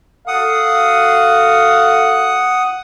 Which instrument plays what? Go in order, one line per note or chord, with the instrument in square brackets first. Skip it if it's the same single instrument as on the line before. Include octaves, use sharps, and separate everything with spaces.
[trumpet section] F#4 A4 F5 [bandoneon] F#5 D#6